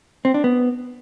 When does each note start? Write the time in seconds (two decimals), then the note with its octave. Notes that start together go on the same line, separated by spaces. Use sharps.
0.25 C4
0.34 D4
0.44 B3